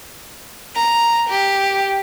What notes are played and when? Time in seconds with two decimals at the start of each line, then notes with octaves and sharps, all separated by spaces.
0.76 A#5
1.30 G4